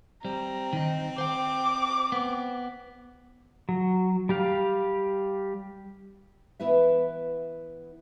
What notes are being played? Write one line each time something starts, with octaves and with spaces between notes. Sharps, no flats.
G3 C4 A#5
D#3 D#4
C5 G5 D6
B3
F#3
G3 G4 F5
E3 B3 E4 B4 E5